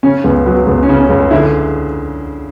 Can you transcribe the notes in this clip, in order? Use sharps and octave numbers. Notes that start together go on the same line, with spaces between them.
C#3 C#4
C#2 B3
F#3 B3
C#2 B3
C#4
C#3
C#4
C#2
D3 E4